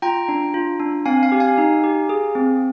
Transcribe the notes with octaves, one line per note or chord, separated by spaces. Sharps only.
F4 G5 A#5
D4
F4
D4
C4 F5 G#5
F5 G#5
G4
F5 G#5
D#4
G4
G#4
C4